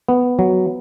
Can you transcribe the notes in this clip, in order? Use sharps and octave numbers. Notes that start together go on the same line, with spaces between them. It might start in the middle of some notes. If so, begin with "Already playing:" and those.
B3
F#3